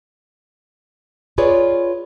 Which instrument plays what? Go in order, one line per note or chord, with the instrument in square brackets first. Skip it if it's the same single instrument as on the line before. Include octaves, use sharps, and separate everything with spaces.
[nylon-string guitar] F4 G#4 B4 C#5 D5